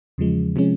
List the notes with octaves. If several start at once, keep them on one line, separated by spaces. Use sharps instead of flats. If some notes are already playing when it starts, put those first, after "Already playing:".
E2 C#3 F3 G#3
C3 F3 G#3 C#4